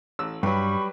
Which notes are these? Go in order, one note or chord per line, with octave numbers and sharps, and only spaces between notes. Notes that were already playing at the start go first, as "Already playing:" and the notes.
A1 E6
G2 F#3 G3 B4 B5 C#6